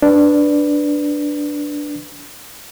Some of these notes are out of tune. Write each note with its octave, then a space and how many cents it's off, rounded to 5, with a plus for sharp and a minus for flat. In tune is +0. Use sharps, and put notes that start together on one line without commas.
D4 +0 B4 +0